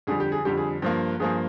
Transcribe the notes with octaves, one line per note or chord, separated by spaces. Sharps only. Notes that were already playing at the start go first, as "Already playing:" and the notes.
F2 D3 G3 G#4
G4
G#4
F2 D3 G3 G4
G#4
G2 F3 A#3
G2 F3 A#3 G#4